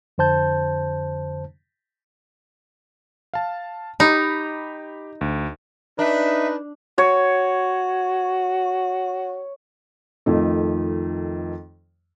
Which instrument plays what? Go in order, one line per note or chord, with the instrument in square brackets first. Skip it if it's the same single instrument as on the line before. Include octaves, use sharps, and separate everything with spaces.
[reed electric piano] F2 D3 C5 A5 G6
[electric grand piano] F5 A5
[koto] D#4 [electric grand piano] G4 B5
[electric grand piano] D2
[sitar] D4 [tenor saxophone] D#4 [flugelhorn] B4 [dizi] E5
[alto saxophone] F#4 [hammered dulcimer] C#5
[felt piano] F2 D#3 A3